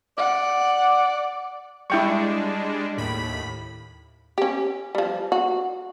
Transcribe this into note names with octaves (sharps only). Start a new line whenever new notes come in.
D5 F#5
G3 G#3 D4 E4 G5 C#6
D#2 A2 B5
C#4 G4
F3 G3
F#4